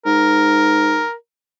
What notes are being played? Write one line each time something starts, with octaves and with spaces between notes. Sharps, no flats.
G#2 A#4